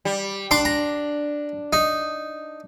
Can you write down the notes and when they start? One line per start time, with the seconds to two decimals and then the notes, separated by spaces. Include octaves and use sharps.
0.05 G3
0.51 D4 C6 D6
0.65 A#5
1.73 D#4